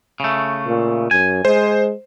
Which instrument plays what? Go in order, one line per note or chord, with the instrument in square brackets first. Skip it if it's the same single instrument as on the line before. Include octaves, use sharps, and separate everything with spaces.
[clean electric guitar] C#3 A3
[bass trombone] A#2
[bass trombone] F#2 [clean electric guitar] G#5
[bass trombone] G#3 [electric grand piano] C5